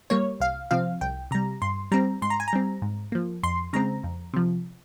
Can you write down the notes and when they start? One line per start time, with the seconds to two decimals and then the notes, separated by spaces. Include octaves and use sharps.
0.10 G3 A#3 C#5
0.40 C2 F5
0.71 C3 F3 C4 F5
1.01 C2 G5
1.31 C3 G3 A#5
1.62 G2 C6
1.91 G3 C4 A#5
2.22 G#2 C6
2.30 A#5
2.40 G#5
2.48 A#5
2.53 G3 C4
2.82 G#2
3.12 F3 A#3
3.43 F2 C6
3.73 C#3 G#3 C4 A#5
4.04 F2
4.34 C3 F3